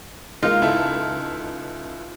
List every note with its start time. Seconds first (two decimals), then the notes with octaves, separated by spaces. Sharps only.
0.42 G#3 A#3 D#4 F4
0.62 C#2 E4 A4